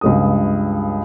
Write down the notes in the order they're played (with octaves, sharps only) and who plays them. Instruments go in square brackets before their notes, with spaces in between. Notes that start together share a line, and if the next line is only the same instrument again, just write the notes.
[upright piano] C#2 G2 D#6